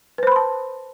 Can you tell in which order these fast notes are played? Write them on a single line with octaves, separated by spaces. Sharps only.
B4 C5 B5 C6 A5